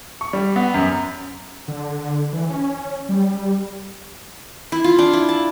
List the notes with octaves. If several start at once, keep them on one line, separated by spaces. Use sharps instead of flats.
C#6
G3
B3
F#2
D3
E3
C#4
G3
E4
F4
D4
E4
A5